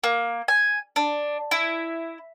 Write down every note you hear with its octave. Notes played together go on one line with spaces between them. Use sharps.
A#3
G#5
D4
E4